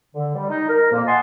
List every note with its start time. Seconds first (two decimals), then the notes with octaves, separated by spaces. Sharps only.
0.15 D3
0.35 G3
0.50 D#4
0.69 A#4
0.92 F2 A#2 A#3
1.07 D#5 F#5 G#5 A5 C6